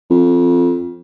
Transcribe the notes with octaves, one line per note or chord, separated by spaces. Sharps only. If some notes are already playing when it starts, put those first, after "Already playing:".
F2